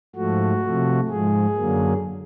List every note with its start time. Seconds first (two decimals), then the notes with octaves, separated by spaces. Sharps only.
0.16 G#2 F3 A3 F#4
0.63 C3 F3 A3
1.09 G#2 F3 G#3 G#4
1.56 F#2 D3 F#3 A#3